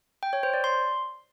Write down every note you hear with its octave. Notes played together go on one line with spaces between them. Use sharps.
G5
C#5
C5
D5
C6